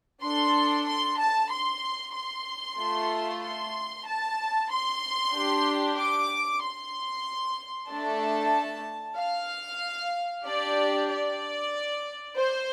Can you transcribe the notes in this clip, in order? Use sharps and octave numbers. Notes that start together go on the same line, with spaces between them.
D4 A4 C6
C6
A5
C6
C6
A3 F4 A4
C6
A5
C6
D4 G4
D6
C6
A3 D4 A4 A5
F5
D4 G4 D5
D5
C5